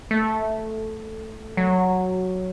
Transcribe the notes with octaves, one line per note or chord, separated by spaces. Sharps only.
A3
F#3